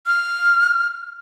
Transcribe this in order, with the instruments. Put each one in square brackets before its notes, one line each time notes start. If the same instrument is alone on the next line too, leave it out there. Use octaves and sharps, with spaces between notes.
[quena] F6